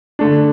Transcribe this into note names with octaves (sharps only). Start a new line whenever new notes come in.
D3 A3 D4